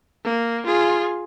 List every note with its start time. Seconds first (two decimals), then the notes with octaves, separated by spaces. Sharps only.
0.25 A#3
0.66 F4 G#4